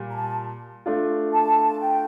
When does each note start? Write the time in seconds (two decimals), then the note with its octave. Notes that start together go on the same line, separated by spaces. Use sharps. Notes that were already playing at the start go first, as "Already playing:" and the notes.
Already playing: A#2 G3
0.11 A#5
0.15 A5
0.86 A3 D4 F4
1.33 A5
1.80 G5